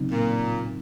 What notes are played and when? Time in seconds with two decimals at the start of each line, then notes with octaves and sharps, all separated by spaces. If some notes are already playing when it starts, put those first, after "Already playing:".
Already playing: C#3 F#3 C4 D#4
0.12 A#2